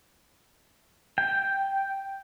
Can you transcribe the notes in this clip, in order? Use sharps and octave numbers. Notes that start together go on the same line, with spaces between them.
G5